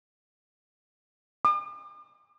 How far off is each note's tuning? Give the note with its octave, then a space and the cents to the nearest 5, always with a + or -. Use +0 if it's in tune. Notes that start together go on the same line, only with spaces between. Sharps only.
D6 +45